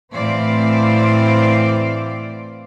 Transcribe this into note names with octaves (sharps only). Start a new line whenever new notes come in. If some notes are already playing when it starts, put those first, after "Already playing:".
A2 E3 C4 C5 D5 F5